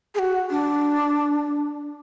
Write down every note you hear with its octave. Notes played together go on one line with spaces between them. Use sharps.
G#4
F#4
D4